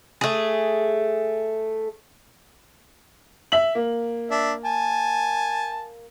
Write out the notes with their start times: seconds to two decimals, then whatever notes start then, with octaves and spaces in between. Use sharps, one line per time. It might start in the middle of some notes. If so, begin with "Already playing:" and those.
0.21 A3 G#4
3.52 E5 F#7
3.75 A#3
4.30 D4 E5
4.65 G#5 A5